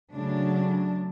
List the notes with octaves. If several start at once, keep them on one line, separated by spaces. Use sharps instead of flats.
C#3 F#3 A3 D4